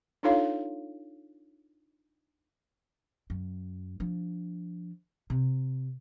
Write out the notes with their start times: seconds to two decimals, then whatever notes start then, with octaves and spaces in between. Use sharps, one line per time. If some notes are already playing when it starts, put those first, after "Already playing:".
0.23 D4 D#4 F4 A4 C#5 F5
3.30 F#2
4.00 F3 D4
5.30 C3